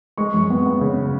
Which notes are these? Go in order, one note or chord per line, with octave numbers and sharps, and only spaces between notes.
G#3 C#6
F#2
B3
B3
C#3